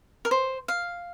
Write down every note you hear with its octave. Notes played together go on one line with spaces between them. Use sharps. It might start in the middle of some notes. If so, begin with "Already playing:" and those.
A#4
C5
F5